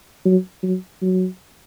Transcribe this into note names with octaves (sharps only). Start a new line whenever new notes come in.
F#3
F#3
F#3